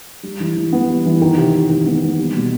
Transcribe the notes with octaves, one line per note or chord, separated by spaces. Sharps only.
G3
E3
E3
B3
G3
E3
D#3
C3
C3
D#3
B3
B3
G3
B2